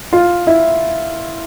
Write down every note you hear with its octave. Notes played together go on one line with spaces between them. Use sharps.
F4
E4